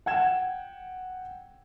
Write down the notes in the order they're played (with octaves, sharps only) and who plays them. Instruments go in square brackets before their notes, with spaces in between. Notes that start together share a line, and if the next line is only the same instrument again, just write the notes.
[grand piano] F#5 G5 G#6 E7